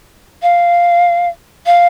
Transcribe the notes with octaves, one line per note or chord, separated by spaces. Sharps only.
F5
F5